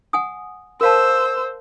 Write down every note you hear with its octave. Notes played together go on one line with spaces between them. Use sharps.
F#5 G#5 D#6
A#4 C5 F5 A5 E6